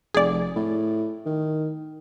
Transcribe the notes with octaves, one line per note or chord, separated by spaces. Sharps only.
F1 G#4 D5
A2
D#3